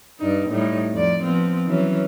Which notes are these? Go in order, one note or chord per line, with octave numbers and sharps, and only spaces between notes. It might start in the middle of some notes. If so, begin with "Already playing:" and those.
G2 D4 D#4
A2 G3 D#4
F2 D5
F3 B3 C4
E3 F#3 C#4